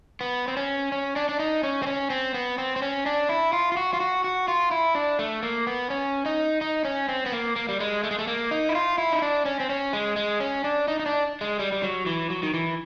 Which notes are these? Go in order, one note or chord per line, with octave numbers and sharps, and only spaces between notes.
B3
C4
C#4
C#4
D4
D4
D#4
C#4
C4
C#4
C4
B3
C4
C4
C#4
D4
E4
F4
F4
F#4
F4
F#4
F#4
F4
E4
D4
A3
A#3
B3
C#4
D#4
D#4
C#4
C4
B3
A#3
A#3
G3
G#3
A3
G#3
A3
A#3
D#4
E4
F4
E4
D#4
D4
C#4
C4
C#4
G#3
G#3
C#4
D4
D#4
D#4
D4
G#3
G3
G3
F#3
E3
F#3
D#3
E3